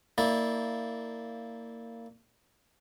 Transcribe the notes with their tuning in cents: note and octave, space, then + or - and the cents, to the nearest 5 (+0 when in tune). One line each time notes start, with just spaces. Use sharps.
A#3 -20 E4 -25 D5 +0